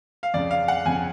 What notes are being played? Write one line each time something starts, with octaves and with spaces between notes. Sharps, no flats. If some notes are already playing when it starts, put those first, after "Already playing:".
F5
F2 C#3 D5
F5
F#5
F2 C#3 G#5